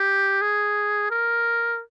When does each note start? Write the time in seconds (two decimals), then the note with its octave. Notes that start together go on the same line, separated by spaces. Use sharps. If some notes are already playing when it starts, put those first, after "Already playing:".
Already playing: G4
0.42 G#4
1.11 A#4